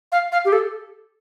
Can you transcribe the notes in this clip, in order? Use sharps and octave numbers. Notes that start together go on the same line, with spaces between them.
F5
F5
G4
A4